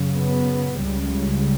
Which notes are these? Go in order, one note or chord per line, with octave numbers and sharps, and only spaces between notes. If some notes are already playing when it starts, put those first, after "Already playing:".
Already playing: F#2 C#3
B3
C#2 C#3 G3
G3